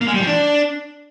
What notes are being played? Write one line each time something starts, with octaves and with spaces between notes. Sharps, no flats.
A#3
G#3
G3
F3
D4